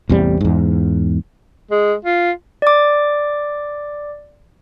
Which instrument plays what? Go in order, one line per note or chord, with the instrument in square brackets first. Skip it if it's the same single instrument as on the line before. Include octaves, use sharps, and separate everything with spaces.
[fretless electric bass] A1 E2 C3 G3
E2 G#2
[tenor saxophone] G#3
F4
[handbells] D5 D6